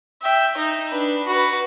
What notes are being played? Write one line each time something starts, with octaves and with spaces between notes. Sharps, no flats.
E5 G5
D#4
D4 B4
F#4 B4